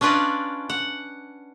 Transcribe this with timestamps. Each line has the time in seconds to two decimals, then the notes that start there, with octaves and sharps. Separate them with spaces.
0.01 C#4 D4 F4 B4 D5 D#5
0.70 F#5